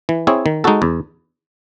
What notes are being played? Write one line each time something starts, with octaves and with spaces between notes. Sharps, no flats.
E3
C4 E4 G#4 C#5
D#3
G#3 D#4 F#4 A4
E2